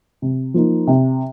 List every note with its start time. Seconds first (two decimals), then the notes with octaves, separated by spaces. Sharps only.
0.22 C3
0.54 F3 A#3 D#4
0.87 C3